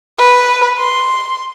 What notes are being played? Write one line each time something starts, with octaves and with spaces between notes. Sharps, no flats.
B4
C6